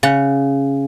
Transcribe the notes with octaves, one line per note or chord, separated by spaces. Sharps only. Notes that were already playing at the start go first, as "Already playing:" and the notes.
C#3 F#5